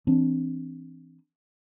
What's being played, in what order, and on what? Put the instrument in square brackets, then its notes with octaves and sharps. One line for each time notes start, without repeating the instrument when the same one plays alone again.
[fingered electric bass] E3 C4 D4